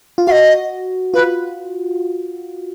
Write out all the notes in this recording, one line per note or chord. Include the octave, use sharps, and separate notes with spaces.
F4
F#4 D#5 F5
F4 B4